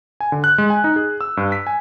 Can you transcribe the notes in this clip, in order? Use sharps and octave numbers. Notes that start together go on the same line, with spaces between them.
G#5
D3
F#6
G#3
G#5
D#4
G#4
E6
G2
B6
G#5